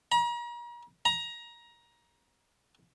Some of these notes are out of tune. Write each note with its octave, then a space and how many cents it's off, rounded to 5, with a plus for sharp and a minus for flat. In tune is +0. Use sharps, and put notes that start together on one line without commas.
A#5 +40
A#5 +20